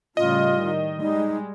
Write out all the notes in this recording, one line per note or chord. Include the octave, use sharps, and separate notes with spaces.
A2 C#3 G3 F4 D#5
D#3
G3 G#3 D#4